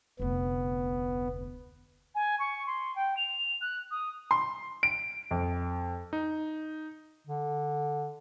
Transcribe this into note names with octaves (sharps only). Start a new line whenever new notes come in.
F1 D2 B3
G#5
C#6
C6
G5
F7
F#6
D#6
C6
D7
F2
D#4
D3